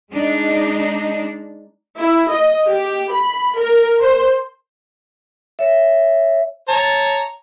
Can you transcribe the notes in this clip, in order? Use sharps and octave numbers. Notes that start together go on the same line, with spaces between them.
G#3 D4 D#4
E4
D#5
G4
B5
A#4
C5
C#5 E5
C#5 A5 A#5